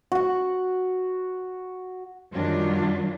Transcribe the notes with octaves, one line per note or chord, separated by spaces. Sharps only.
F#4 F#5
F#2 D#3 F#3 G3 D4 F4